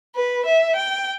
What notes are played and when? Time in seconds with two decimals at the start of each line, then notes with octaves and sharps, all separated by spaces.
0.15 B4
0.46 E5
0.76 G5